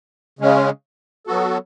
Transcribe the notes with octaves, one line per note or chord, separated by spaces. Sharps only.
C#3 G#3 C#4
F#3 B3 F#4 A4